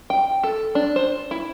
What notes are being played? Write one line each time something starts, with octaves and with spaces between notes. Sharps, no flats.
G5
A4
D4
C5
E4